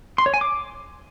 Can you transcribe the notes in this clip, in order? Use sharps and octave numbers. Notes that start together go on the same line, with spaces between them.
C6
C#5
G#5
D6